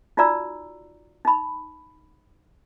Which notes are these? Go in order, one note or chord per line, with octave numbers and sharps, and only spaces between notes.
D#4 F4 F#4 D5 A#5 E6
D#4 B5